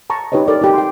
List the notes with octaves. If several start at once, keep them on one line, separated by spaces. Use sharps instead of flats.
A5 A#5 C#6
D#4 G4 B4 C#5 D#5
G4 A4 A#4 D5
D#4 G4
G5 C6